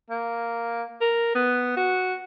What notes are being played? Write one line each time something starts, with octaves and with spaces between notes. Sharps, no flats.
A#3
A#4
B3
F#4